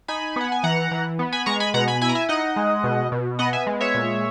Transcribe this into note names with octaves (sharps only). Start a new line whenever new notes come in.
D#4 G#5 B5
B3 F#5
G#5
E3 F#5 A#5
E3
B3
G#5 B5
G#3 A#5 C#6
G#5 B5
B2 F#5 A#5
G#5 B5
E4 G#5 B5
A#5
E5 G#5
D#4 D#5 F#5
G#3
B2
B2
B3 D#5 F#5
E5 G#5
G#3
C#5 E5
A#2